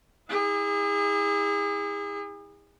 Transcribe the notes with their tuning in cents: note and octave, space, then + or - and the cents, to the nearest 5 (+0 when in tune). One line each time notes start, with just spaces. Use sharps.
E4 -40 G#4 -35